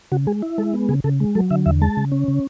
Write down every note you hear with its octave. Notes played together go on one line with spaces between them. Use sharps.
C#3 F#4
G#3 G#4
E4
G#3 A4
B3
C#3 G#4
C#3 A4
G#3
F#3 A4
D3 E5
E2 E5
G#3 A5
C#3
C#4
C#3